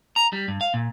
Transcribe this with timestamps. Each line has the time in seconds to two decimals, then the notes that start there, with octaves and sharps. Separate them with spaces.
0.16 A#5
0.33 G3
0.48 G2
0.61 F5
0.74 A#2